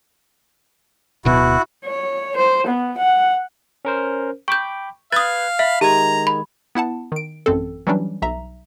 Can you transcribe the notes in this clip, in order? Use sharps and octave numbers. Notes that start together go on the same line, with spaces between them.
D1 B2 E4 F#4
C#5
C5
B3
F#5
C#4 A#4 C5
G5 B5 C#6 D6 G6
B4 F5 D#6 F#6 G#6 A6
E5 B5 B6
D#3 G#3 G4 A#5 G#6
B5
B3 E4 F#5 A5
D#3 D7
A1 F#2 C4 A4
E3 F#3 G3 C#4 D4
B1 E5 A#5